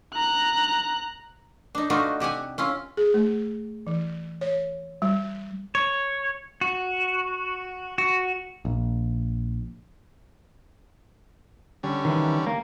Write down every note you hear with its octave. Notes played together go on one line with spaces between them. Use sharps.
A#5 F#6
D4 D#4
A3 D4 D#4 F4 F#4 B4
C3 G4 F#5 G#5
C#4 E4 F4
G#4
A3
E3
C#5
G3
C#5
F#4
F#4
A#1
D3 G3 C#4
D#3 E3
A#3